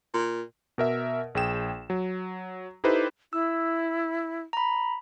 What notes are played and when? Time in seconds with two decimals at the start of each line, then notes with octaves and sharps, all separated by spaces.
0.14 A#2
0.78 B2 A#4 E5
1.35 A#1 G#4 G5 E7
1.90 F#3
2.84 D#4 E4 G4 A4 B4 C5
3.33 E4 E6
4.53 A#5 B5